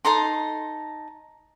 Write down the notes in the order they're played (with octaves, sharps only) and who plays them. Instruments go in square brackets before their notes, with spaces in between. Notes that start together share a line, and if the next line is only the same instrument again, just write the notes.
[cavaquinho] D#4 A4 A#5 C6